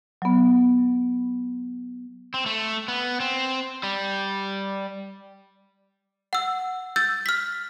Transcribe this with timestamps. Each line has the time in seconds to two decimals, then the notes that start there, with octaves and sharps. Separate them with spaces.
0.22 F#3 B3
2.34 C4
2.46 A3
2.88 B3
3.20 C4
3.83 G3
6.33 F#5 E6
6.96 E6 G6 A6
7.26 F6 B6